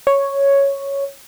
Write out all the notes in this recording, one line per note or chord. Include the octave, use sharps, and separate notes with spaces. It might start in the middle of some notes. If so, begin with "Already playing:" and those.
C#5